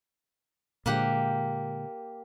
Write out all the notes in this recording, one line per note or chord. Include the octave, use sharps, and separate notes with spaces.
A#2 D3 G#3 A#3 G4 F#5